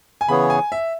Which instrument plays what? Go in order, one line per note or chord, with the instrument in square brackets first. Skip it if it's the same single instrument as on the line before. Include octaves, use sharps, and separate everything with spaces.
[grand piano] G#5
[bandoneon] C#3 E3 B3 G#4 C#5 [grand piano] B5
[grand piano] G#5
E5